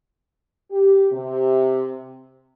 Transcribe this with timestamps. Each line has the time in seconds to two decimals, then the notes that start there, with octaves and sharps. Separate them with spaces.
0.71 G4
1.12 C3